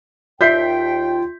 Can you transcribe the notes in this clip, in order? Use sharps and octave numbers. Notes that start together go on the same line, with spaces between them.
D#2 F4 D5 E5 G5 G6 B6 C7